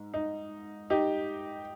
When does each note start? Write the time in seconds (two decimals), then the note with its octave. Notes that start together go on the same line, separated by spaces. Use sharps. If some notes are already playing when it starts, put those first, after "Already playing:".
Already playing: G#2
0.14 D#4
0.90 D#4 G4